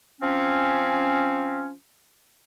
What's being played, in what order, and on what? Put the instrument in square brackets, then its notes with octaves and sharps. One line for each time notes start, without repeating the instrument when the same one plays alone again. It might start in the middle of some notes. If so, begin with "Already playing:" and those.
[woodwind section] F3 C4 C#4